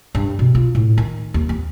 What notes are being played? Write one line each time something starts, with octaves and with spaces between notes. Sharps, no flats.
G2
B2
F4
A2
D#3
D#2
B3